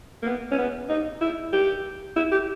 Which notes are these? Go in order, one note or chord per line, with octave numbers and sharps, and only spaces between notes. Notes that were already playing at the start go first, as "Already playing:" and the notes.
A#3
B3
C#4
B3
D#4
E4
G4
E4
G4